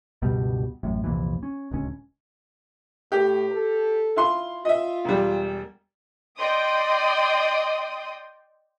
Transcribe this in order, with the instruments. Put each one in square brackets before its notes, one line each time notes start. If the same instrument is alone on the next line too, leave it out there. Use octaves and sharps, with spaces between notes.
[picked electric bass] C#2 G2 B2 G3
A1 F#2 A2
C2 F2 A#2 E3
C#4
D1 C#2 C#4
[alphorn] A2 [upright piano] G4
[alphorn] A4
[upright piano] E4 F4 C6
[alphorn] F4 [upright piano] D#5 E5
[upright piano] E1 G3
[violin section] D5 D#5 G5 C6 D#6